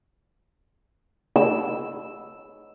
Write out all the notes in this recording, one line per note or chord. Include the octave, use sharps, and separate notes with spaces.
E6